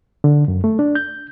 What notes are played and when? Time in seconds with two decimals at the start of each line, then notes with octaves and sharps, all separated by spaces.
0.24 D3
0.48 F#2
0.64 A3
0.79 D4
0.95 G6